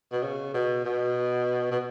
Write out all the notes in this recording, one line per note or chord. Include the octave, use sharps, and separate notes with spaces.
B2
C#3
B2
B2
B2